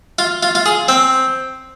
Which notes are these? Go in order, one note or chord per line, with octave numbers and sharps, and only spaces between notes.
F4
F4
F4
G#4
C4